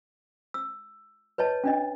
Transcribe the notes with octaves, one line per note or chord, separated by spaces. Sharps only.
E6
B4 C#5 D#5 A5
C#4 D4 D#5